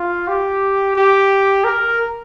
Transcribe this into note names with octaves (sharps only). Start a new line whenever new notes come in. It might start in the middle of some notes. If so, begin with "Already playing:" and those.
Already playing: F4
G4
G4
A#4